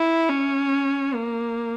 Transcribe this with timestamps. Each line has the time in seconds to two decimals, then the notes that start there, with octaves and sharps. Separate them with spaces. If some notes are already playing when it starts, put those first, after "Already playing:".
Already playing: E4
0.30 C#4
1.14 A#3